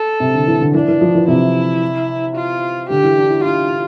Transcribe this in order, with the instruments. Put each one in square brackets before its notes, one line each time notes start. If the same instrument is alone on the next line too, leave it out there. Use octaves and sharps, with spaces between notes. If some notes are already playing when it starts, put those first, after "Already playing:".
Already playing: [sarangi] A4
[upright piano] C3
D3
E3
D3
[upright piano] E3 [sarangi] D4
[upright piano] E3
F3
E3
[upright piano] C3 [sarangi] E4
[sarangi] F4
[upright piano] D3 [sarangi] G4
[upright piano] E3
D4
E4
[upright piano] D4 [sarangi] F4
[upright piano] D4